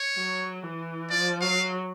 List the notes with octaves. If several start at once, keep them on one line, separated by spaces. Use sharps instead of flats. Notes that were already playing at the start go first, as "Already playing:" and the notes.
Already playing: C#5
F#3
E3
F3 D5
F#3 F5